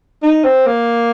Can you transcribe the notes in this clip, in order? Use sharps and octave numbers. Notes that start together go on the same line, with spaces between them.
D#4
C4
A#3